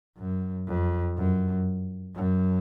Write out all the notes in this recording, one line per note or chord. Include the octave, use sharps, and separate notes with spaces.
F#2
F2
F#2
F#2